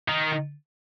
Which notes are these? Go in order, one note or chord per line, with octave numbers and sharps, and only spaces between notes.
D#3